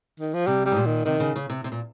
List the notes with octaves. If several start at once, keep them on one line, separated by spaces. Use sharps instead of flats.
D#3
F3
C3 G3
G3
G#2
A#2
D#3
C3 D#3
C#3
C#3
C3
C3
A#2